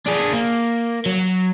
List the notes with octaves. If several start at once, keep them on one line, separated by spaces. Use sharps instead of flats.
D4 G#4
A#3
F#3